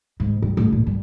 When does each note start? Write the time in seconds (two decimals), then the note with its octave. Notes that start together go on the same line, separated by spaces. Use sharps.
0.20 G#2
0.42 G2
0.57 A1
0.73 A#2
0.86 G2